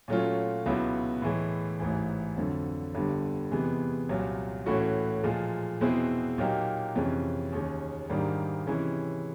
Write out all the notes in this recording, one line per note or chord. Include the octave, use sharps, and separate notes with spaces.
A#2 F#3 A3 C#4 F4
C#2 B2 F#3 B3 E4
A2 E3 G#3
A1 G#2 E3
F2 D3 F#3
G1 G2 D3 G3
E2 C3 E3 G#3 B3
C2 A#2 F#3
A2 E3 A3 C#4 F#4
A#2 F3 G#3
E2 B2 G#3 C4 E4
A#2 F#3 A#3 D#4 G4
F2 C3 E3 G#3 C#4
D#2 D#3 G#3 C#4
G#2 D#3 G3 A#3 D4
C3 E3 G#3 C#4 E4